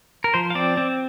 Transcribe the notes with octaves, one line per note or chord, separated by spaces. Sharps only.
A#4
F3 C5
F5
C4 D5
C4